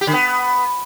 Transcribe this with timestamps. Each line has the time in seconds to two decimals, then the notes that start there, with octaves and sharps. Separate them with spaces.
0.01 G4
0.07 D3
0.13 B3